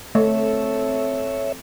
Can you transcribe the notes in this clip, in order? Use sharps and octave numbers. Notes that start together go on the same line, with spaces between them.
A3 C4 A4 C#5 E5